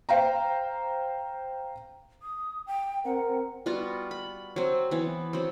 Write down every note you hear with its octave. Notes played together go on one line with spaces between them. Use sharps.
C5 F5 G5 A#5
D#6
G5
C4 A#4 F#5
G3 B3 F4 F#4
B5
F#3 C4
E3 B3
F#3 C4